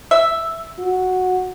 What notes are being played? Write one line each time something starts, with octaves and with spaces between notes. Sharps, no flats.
E5
F#4